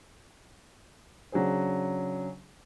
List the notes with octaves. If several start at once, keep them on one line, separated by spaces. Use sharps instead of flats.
C#3 F#3 D4 G#4 C5